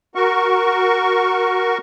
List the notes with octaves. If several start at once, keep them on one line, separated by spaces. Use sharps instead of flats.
F#4 A#4 C#6